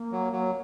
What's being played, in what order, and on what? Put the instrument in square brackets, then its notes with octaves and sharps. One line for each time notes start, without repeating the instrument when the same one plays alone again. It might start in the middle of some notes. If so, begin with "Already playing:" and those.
Already playing: [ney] A#3
[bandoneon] F#3
F#3